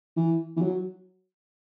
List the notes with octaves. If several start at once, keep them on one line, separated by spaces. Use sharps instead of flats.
E3
E3
F#3